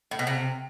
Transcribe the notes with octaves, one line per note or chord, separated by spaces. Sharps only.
A2
B2
C3